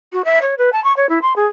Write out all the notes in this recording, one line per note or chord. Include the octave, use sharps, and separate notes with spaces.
F#4
E5
C#5
B4
A5
C#6
C#5
E4
C6
G#4